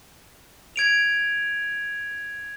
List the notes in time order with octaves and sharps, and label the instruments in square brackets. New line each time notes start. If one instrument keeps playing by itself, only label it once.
[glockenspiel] G#6 D7 F7